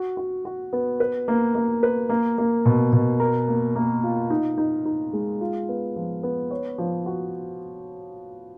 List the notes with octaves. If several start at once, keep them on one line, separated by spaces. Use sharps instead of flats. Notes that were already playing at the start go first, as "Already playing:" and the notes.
Already playing: F#4
F#4
F#4
B3
B4
A#3
A#3
B4
A#3
A#3
B2
B2
A#4
A#3
A#3
F4
D#4
D#4
D#4
G#3
F4
B3
F3
B3
C#5
F3
F#4